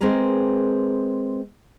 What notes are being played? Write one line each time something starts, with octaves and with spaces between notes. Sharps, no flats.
G#3 C4 G4 G#4 A#4 B4